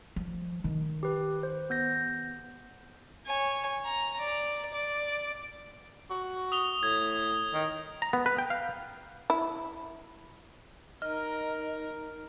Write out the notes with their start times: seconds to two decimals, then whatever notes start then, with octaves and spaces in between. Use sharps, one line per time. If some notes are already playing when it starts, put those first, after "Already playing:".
0.16 F3
0.64 D#3
1.03 G4 B4
1.43 C5
1.70 B3 G6 A#6
3.26 C#5 G#5
3.85 A#5
4.19 D5
4.74 D5
6.10 F#4
6.52 D#6 F7 G7
6.83 A2 G#6
7.54 D#3
8.02 A#5
8.13 B3
8.26 B4
8.38 G5
8.50 F5
9.30 E4
11.02 D#4 A#4 D#5 F6